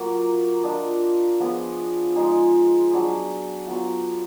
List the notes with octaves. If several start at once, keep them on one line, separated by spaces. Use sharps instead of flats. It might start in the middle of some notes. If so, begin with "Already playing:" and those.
Already playing: F#3 A#3 F4
D4 F4 A#4 D#5
F3 B3 F4 G#4
F3 G#3 D#4 G#4
F#3 D4 G#4
F#3 B3 F4